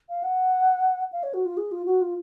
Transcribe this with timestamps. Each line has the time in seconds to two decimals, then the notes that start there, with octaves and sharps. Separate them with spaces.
0.09 F5
0.23 F#5
1.12 F5
1.23 C#5
1.34 F#4
1.45 F4
1.57 G#4
1.72 F4
1.86 F#4
2.01 F4